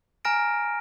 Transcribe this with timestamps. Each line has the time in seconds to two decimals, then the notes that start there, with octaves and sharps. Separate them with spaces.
0.25 G#5 A#5 F6 A#6 D7